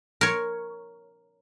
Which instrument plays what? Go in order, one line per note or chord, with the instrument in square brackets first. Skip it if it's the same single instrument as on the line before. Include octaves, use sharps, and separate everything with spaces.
[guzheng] A#4 C#5